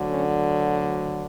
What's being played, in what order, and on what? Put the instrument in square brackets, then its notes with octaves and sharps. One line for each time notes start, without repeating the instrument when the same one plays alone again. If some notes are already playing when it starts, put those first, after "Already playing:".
Already playing: [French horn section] D2 D3 F#3
C#4